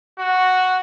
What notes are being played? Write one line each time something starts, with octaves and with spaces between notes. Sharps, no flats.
F#4